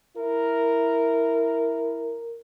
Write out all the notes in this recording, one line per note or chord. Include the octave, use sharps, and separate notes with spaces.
E4 A#4